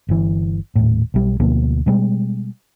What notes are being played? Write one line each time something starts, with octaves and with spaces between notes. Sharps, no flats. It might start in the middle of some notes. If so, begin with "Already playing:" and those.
G1 E3
D#1 A2
B1 G3
D2 B2 F3 A#3
B2 G3 G#3